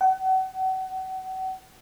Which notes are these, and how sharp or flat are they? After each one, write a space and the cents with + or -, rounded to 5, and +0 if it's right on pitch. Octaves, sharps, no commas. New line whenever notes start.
F#5 +35